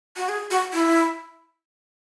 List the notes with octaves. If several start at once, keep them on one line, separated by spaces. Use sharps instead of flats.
F#4
G#4
F#4
E4